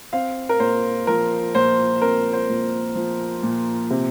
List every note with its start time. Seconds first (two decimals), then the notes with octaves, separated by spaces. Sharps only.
0.13 C4 F5
0.49 A#4
0.60 A#2 C5
1.07 F3 A#4
1.54 A#2 C5
2.02 C4 A#4
2.33 C5
2.48 A#2
2.95 F3
3.43 A#2
3.90 C3